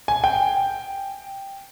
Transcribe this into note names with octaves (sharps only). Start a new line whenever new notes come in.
G#5
G5